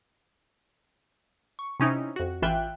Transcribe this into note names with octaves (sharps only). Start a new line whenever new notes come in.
C#6
C3 C#4 D#4 E4
F2 F#4
A1 E3 F4 E5 G5 F#6